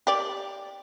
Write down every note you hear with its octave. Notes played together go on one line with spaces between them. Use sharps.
G4 D5